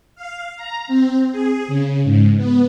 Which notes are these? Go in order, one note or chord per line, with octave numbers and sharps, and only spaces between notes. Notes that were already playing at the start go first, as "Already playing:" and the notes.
F5
A#5
C4
G#4
C#3
G#2
B3